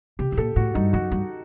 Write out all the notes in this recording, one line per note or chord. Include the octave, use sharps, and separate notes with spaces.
C3 G4
A2
A#2 A4
A2 F#4
G2 D#4
F#2 F#4
G2